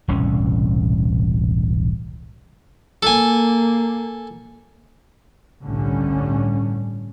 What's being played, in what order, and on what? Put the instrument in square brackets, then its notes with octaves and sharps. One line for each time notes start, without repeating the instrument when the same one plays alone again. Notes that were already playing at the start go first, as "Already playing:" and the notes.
[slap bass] E1 C2 A2 C#4
[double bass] A#3 [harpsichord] A4 G#5
[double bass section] G1 C2 A2 D3 G3 C#4